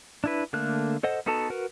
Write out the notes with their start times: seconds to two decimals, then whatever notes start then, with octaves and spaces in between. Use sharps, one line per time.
0.24 D4 E4 B4
0.53 D3 A3 A#3 F#6
1.03 A4 C5 D#5 F#5
1.26 B3 D#4 F#4 A4 A5
1.50 F#4 A#4 B4